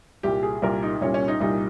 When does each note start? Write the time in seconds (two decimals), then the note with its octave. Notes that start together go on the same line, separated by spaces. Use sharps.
0.23 C2 A#2 G3 G4
0.43 G#4
0.62 C2 A#2 G3 A#4
0.83 D#4
1.01 C2 A#2 G3 C#4
1.14 C#4
1.28 D#4
1.40 C2 A#2 G3 D#4